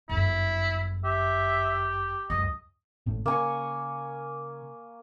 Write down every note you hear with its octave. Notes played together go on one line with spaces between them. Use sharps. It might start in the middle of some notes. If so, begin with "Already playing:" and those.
G1 F#2 E4
G4 E5
C#2 F#2 D#5
G#1 A2
C#3 A#3 G#5 C#6